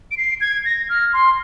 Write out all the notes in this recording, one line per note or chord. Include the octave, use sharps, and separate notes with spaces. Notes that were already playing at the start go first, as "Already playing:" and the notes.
D7
C7
G#6
A#6
F6
C6